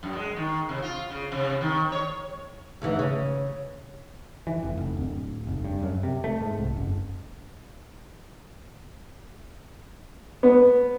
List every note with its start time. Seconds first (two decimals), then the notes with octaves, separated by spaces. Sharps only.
0.03 F#2
0.15 G#3
0.36 D#3
0.69 C3
0.82 F4
1.10 C#3
1.32 C3
1.61 D#3
1.92 C#5
2.82 D2 G#2 E3
2.99 C#3
4.47 E3
4.63 F1
4.78 F1
4.97 D1
5.47 F1
5.64 G2
5.83 F#2
6.03 C3
6.24 A3
6.41 G#2
6.58 C2
6.77 F#1
10.43 B3